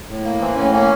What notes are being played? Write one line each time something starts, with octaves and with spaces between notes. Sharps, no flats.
A2
A#3
E3 C4
A2 C#4
A#3 C#4